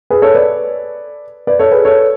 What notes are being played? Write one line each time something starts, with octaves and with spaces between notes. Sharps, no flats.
G#4 B4
A4 C#5
B4 D5
B4 D5
A4 C#5
G#4 B4
A4 C#5